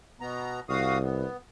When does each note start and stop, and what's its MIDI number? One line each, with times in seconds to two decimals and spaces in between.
0.21 0.60 47
0.21 0.60 59
0.21 0.60 82
0.69 1.25 36
0.69 0.99 66
0.69 0.99 77
0.69 0.99 87
1.03 1.37 59